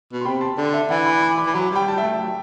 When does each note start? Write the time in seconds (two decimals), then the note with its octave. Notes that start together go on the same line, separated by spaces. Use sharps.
0.13 B2
0.21 C6
0.25 C3 G5 B5
0.41 A5 C6
0.57 D3 D5
0.74 E5
0.90 E3 D5 F#5
1.06 B5 D6
1.22 B5 D6
1.38 B5 D6
1.46 E3
1.54 F#3 B5 D6
1.71 G3 G5 B5
1.86 G3 A5
1.98 A3 E5 G5
2.19 F#3